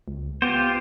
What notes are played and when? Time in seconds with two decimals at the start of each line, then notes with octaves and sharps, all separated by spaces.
0.08 C#2
0.42 B3 F4 G4 C5